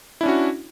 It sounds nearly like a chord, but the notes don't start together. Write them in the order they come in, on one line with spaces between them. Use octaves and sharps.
E4 D4 C#4 F#4